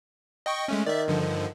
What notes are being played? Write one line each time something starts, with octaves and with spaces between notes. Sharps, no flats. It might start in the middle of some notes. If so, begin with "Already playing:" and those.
D#5 G5 C#6
G#3 A3 C#4
D#3 D5 E5
G2 D3 F3
D#3